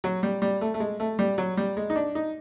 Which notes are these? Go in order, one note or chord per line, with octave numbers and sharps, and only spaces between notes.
F#3
G3
G3
A3
A3
G#3
A3
G3
F#3
G3
G#3
D#4
D4
D#4